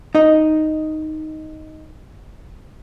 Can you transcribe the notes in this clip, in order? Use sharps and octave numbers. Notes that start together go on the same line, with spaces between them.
D#4 D#5